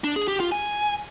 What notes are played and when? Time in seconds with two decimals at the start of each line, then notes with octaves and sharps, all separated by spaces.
0.04 D4
0.16 G#4
0.28 G4
0.40 F4
0.52 G#5